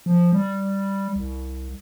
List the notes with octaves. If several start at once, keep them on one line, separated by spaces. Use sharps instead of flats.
F3
G3
C2